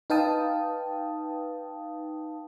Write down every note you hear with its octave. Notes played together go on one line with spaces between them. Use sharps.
D#4 B4 F5 G5 A5 D#6